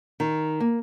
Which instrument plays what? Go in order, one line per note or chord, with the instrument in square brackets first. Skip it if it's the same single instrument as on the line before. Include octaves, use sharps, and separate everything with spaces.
[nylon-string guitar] D#3
A#3